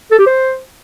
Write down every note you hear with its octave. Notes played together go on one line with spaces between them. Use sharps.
A4
G4
C5